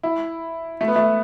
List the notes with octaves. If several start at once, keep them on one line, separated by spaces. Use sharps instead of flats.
E4
A3
B3
A3